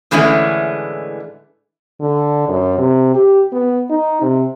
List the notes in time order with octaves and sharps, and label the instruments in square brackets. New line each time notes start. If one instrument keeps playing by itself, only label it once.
[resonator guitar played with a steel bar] A2 D3 E3 G#3 A3 C#4
[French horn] D3
F#2
C3
G4
B3
D#4
C3